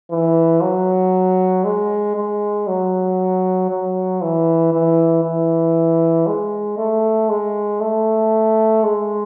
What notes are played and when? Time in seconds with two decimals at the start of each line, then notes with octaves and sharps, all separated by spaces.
0.11 E3
0.62 F#3
1.64 G#3
2.16 G#3
2.67 F#3
3.69 F#3
4.21 E3
4.72 E3
5.24 E3
6.27 G#3
6.78 A3
7.29 G#3
7.80 A3
8.83 G#3